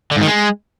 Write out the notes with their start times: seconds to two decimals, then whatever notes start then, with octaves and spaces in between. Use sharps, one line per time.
0.11 D3
0.16 G#2
0.22 D#3
0.27 G#3